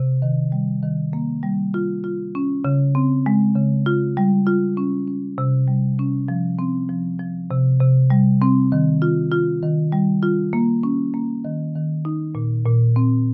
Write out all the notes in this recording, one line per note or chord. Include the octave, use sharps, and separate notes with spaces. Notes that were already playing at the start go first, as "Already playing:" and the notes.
Already playing: C3
D#3
G3
D#3
A#3
G3
F4
F4
C#4
C#3
C4
G#3
C#3
F4
G3
F4
C#4
C#4
C3
G3
C#4
F3
C4
F3
F3
C3
C3
G3
C4
D#3
F4
F4
D#3
G3
F4
A#3
C#4
A#3
D#3
D#3
D#4
A#2
A#2
C4